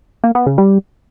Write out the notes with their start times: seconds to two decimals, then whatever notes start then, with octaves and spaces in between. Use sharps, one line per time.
0.24 A#3
0.35 B3
0.46 C#3
0.58 G3